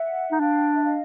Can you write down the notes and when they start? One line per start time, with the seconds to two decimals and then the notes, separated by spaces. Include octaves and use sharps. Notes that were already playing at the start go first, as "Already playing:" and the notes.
Already playing: E5 F#5
0.32 D#4
0.40 D4 F5 G5
0.75 E5
0.83 D#5 F5